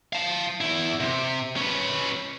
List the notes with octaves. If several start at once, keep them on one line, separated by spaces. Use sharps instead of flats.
F5 A5
E2 E4
C3
C#4 B4